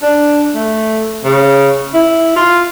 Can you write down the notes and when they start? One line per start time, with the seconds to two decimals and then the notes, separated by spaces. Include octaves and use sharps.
0.02 D4
0.54 A3
1.24 C#3
1.94 E4
2.36 F4